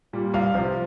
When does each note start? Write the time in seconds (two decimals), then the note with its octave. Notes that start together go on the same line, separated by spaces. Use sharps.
0.13 A#2 G3
0.34 C2 F5
0.54 C3 F3